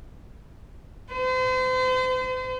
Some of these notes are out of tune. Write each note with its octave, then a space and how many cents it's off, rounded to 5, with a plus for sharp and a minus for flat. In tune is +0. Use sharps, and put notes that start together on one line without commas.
C5 -40